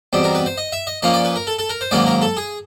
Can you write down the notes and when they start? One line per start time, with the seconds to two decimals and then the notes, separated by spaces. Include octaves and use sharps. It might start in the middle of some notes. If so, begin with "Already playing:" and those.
0.13 E2 B2 G3 C4
0.24 A#4
0.35 B4
0.46 C5
0.58 D#5
0.72 E5
0.87 D#5
1.02 A#2 F3 A#3 C#4 D#5
1.14 D5
1.25 B4
1.36 A#4
1.47 A4
1.59 A4
1.69 A#4
1.81 C5
1.91 G#2 D#3 F#3 A#3 C#4 D5
2.07 A#4
2.22 A4
2.37 G#4